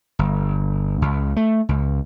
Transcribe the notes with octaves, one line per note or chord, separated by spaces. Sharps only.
G1
C#2
A3
C#2